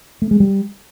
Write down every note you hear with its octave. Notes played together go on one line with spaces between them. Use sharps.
A3
G#3
G3